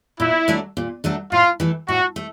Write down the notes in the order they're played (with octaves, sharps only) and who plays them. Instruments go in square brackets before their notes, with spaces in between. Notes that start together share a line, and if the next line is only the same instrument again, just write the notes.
[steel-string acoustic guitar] A#2 [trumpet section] E4
[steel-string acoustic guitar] F#3 A3 D4
A#2
F#3 A3 D4
[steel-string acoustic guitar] A2 [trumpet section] F4
[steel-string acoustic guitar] E3 A3
[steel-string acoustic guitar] A2 [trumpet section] F#4
[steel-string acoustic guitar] A3